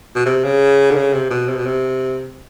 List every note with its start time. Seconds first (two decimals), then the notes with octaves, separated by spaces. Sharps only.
0.15 B2
0.26 C3
0.44 C#3
0.91 D3
0.96 C#3
1.13 C3
1.30 B2
1.49 C3
1.57 B2
1.66 C3